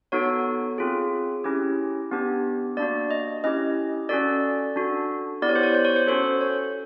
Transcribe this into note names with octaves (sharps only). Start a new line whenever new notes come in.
B3 D#4 F#4 A4 C#5
C4 F4 G#4
C#4 E4 G4
B3 D4 G4
A#3 D4 F#4 D5
D#5
C#4 E4 G4 D#5
C#4 F#4 A4 D5
D4 F#4 A4
B3 E4 G4 D5
C#5
C5
C#5
C5
C#5
C5
C#4 F#4 A4 C5
C#5